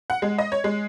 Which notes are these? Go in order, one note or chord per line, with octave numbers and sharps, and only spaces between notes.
F#5
G#3
D#5
C#5
G#3